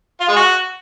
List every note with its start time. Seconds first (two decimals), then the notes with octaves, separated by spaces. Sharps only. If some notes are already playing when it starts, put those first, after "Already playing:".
0.20 F4
0.28 G#3
0.36 F#4